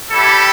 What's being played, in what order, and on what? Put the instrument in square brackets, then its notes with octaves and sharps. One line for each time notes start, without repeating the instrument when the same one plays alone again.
[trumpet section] G3 E4 G4 A4